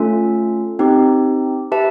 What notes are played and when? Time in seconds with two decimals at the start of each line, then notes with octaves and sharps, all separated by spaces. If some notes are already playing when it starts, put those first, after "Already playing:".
Already playing: A3 C#4 F4 A4
0.79 C4 D#4 G4
1.72 G4 B4 E5 A5